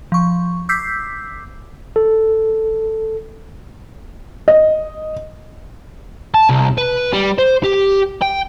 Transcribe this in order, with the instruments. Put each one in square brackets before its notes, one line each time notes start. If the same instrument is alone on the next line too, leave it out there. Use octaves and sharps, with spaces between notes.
[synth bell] F3 C#6
D6 E6 G6 B6 C7
[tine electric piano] A4
[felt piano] D#5
[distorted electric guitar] A5
C2
B4
G3
C5
G4
G5